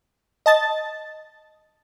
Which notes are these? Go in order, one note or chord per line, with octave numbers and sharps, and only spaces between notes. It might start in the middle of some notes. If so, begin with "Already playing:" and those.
D#5 A5 A6